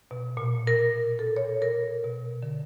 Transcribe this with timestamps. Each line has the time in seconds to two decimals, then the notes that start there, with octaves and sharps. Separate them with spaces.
0.11 B2
0.37 A#2
0.67 A#4
1.19 A4
1.36 C#5
1.62 A#4
2.04 B2
2.43 D3